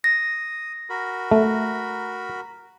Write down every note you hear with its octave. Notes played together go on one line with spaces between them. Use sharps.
D#6 A#6
F#4 A#4 B5
A3